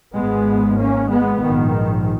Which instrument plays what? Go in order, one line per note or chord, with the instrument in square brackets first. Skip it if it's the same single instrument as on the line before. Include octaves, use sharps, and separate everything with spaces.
[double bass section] G#1 G#2 G#3 B3
A#3 C#4
G#3 B3
A#1 G#2 D#3